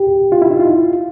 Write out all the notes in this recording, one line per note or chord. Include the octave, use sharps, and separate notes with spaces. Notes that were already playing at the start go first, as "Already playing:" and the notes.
Already playing: G4
F4
E4
D#4
F4